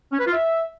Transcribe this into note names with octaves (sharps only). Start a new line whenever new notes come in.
C#4
B4
F4
E5